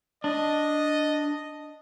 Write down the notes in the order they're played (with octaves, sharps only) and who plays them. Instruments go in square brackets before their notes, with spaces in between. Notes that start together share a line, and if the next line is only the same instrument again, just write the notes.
[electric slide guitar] D4 [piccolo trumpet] D#5